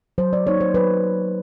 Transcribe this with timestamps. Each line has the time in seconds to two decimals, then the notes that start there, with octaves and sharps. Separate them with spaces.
0.18 F#3 C5
0.33 D5
0.46 A#3 D#4 C#5
0.61 C5
0.74 F#3 B4